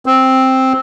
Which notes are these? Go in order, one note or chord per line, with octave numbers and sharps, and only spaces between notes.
C4